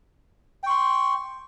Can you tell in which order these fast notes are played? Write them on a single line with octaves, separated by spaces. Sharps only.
G5 C#6 C6